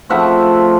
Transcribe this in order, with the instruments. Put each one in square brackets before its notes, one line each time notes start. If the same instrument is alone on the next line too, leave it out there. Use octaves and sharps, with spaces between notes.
[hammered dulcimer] C#3 F3 A3 C4 E5 F#5